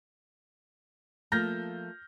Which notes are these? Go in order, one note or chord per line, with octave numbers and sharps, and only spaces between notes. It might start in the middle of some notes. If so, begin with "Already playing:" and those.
F3 A3 A#3 F6 G6 A#6